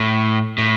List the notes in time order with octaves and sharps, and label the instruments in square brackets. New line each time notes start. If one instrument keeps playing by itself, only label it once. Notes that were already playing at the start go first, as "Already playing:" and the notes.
Already playing: [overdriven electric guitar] A2
A2